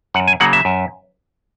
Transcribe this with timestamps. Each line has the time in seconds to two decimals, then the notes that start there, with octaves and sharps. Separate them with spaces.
0.14 F#2 F#5
0.28 G#5
0.40 C#3 F#3 A#3 F#5
0.53 E5
0.65 F#2